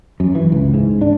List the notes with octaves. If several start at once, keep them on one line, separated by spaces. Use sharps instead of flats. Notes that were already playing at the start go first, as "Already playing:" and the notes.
F#2
E3
C#2
G#2
D4